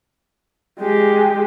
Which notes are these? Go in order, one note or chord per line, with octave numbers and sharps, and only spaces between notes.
G#3 G4